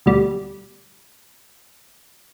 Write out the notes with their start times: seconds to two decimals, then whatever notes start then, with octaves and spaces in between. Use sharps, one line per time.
0.06 D2 B2 G3